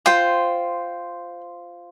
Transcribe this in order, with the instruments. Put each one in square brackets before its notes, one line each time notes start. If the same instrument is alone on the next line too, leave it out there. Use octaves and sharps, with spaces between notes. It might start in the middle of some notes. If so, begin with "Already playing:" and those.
[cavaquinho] F4 C5 G5